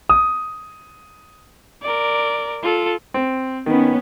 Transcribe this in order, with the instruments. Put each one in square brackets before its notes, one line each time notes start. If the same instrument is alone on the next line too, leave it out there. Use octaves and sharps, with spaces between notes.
[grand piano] D#6
[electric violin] A#4 D5
F4 A4
[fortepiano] C4
[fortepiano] D#3 [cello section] B3 C#4